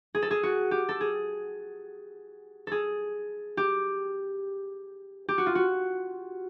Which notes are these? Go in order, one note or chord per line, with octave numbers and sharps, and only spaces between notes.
G#4
A4
G#4
F#4
G4
A4
G#4
G#4 A4
G4
G4
F#4
F4
F#4